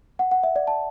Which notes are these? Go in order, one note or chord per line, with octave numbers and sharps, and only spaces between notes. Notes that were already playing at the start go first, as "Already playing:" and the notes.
F#5
F#5
E5
D5
A5